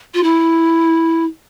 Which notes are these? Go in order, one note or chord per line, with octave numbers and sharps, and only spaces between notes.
F4
E4